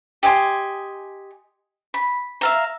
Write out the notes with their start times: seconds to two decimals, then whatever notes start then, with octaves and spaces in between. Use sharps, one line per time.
0.23 G4 D#5 G#5 C6
1.94 B5
2.41 E5 F5 A#5